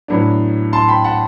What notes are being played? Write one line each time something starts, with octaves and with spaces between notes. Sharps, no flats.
A2 F#3 B3 D4
A5 C6
G5 B5
F#5 A5